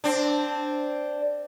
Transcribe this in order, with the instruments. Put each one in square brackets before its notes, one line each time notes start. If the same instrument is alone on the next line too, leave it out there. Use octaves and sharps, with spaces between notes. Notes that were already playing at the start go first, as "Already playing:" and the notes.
[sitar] C4 D4